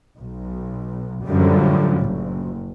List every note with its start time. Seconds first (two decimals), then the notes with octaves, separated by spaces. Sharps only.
0.19 B1
1.26 F#2 A2 D3 F3 G3
2.00 F#1